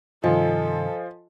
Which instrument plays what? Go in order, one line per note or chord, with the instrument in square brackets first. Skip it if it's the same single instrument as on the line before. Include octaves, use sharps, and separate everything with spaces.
[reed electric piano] G2 C3 D#3 [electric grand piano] F3 F4 [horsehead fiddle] A4 [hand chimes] D#5 G#5